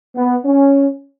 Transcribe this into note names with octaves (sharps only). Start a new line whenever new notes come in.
B3
C#4